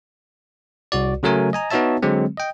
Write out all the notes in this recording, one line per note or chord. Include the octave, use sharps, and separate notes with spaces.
C2 F#4 D5
C#3 F#3 A3 A#4 G#5
D#5 G#5 A#5
B3 D#4 F#4 C#5 E5 A5
D3 F#3 G#3 C4
D#5 G5